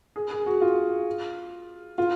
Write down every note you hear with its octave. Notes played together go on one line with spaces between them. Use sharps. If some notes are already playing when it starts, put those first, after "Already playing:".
G#4
G#4
F#4
F4
F4